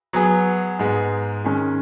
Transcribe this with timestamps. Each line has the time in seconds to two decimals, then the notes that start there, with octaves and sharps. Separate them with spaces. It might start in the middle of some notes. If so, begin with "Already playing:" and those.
0.13 F#3 B3 G#4
0.79 G#2 G#3 B3
1.45 D#3 G#3 C#4